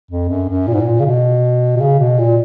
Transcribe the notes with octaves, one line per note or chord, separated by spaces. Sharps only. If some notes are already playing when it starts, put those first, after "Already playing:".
F2
F#2
F#2
A#2
G#2
A#2
C#3
B2
B2
C#3
B2
A#2